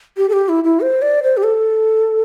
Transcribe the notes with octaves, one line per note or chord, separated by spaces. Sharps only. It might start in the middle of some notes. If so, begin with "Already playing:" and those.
G4
A4
G4
E4
E4
C5
D5
C5
G4
A4